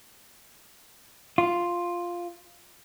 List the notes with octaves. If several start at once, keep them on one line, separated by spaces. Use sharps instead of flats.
F4